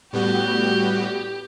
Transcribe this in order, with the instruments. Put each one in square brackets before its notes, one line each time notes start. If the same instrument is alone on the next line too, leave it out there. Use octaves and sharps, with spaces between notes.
[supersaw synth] A2 G3 B3 F#4 [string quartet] G4